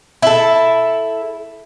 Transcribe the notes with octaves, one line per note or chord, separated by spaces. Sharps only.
E4 A4